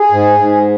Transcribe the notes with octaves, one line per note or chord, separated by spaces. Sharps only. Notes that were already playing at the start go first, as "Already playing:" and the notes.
Already playing: G#4
G#2
G#2